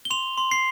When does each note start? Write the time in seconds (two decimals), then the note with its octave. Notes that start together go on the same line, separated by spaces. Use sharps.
0.05 G7
0.10 C6 F7
0.38 C6
0.51 C7